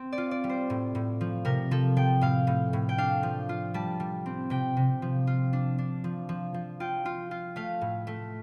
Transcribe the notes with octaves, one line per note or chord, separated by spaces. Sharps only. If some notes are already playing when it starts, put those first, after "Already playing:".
Already playing: C4
D5
F4
D5
G3
C5
A2
A2
F3
C3 A#4
F3 A4
F3 G5
A2 F5
A2
A2
G5
D4 F5
F3
F4
G3 A5
G3
C4
C3 G5
C3
F3
F4
D4
D4
F3
F3
F3
F4 G5
F4
F4
A3 F5
A2
A3